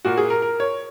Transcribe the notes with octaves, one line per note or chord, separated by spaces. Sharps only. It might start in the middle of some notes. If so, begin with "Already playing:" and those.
A#2 A#3 F#4
G#4
A#4
A#4
C#5